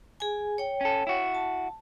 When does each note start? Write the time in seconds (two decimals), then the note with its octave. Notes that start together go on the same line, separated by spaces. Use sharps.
0.20 G#4 G#5
0.58 C#5 G5
0.81 C#4 A4
1.07 E4 F#4
1.35 A5